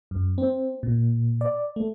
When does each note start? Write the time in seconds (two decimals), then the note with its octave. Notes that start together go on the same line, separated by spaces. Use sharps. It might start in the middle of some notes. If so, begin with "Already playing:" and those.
0.11 F#2
0.38 C4
0.83 A#2
1.41 D5
1.76 A3